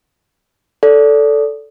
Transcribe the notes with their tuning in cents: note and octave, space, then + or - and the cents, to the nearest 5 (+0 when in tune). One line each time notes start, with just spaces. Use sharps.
A4 +0 D5 -25